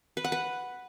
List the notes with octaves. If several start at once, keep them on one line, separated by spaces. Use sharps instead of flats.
B4
F#5
B4